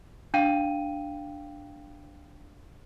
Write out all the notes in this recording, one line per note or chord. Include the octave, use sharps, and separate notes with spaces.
D4 F5 G5 D#7